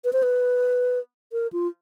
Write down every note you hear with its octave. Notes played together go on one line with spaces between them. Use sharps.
B4
C5
B4
A#4
F4